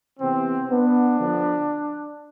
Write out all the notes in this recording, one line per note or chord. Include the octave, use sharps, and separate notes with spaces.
C3 E3 B3 C4
B3 D4
D3 F3 B3